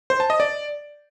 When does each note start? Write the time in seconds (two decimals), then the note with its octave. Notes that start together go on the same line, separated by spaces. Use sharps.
0.10 C5
0.20 A5
0.30 D#5
0.40 D5